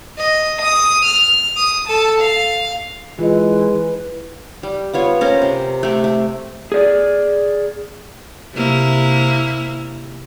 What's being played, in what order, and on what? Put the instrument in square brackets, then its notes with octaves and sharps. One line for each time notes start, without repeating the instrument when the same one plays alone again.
[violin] D#5
D#6
F6
D#6
A4 A5
F5
[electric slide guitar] E3 [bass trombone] G#3 [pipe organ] E4 B4 [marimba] F4 D#5
[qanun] G3
B3 F4 C#5
C#4 A#4 C5
C3
A3 G4
A3
[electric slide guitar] G#4 D5
[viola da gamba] C3 A#3 E4